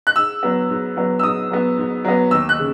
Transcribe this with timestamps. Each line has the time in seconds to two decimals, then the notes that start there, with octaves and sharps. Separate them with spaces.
0.07 F#6
0.16 G#2 E6
0.43 F#3 B3
0.70 G#2
0.97 F#3 B3
1.19 E6
1.23 G#2 D#6
1.50 F#3 B3
1.78 G#2
2.04 F#3 B3
2.31 D#2 E6
2.49 F#6
2.58 C#3